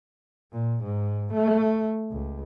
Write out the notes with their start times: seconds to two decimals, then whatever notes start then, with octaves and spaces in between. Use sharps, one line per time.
0.52 A#2
0.84 G#2
1.34 A3
2.12 C#2